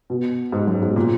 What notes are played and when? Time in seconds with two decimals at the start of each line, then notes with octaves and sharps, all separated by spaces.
0.10 B2
0.52 G#2
0.67 F#2
0.83 G#2
0.96 A#2